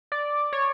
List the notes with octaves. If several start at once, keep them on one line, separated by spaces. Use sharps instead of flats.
D5
C#5